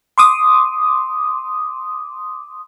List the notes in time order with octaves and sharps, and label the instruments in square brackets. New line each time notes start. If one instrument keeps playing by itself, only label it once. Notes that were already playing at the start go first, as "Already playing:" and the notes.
[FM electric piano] C6 D6 D#6